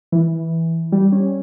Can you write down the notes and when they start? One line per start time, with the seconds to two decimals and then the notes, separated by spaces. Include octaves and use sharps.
0.12 E3
0.92 G3
1.12 C#4